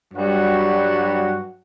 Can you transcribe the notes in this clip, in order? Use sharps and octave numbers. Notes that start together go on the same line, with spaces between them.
G2 F#3 G3 F#4